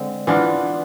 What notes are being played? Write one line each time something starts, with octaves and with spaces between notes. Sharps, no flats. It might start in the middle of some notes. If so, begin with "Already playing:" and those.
Already playing: D3 G#3 C4
E3 B3 D4 F4